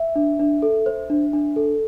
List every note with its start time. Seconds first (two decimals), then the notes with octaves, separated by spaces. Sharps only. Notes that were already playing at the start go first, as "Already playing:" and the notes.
Already playing: E5
0.15 D4
0.39 D4
0.62 A4
0.86 C5
1.10 D4
1.33 D4
1.56 A4